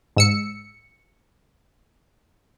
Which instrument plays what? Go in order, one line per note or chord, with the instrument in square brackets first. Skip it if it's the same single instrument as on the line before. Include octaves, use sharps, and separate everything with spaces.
[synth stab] G#2 E6 C#7